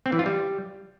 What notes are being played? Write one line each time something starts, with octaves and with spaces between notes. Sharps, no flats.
C4
E3
F4
G3